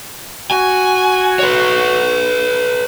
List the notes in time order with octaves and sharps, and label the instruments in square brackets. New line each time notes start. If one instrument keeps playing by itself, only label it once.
[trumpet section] F#4 [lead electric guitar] G#5
[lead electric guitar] B4 C#5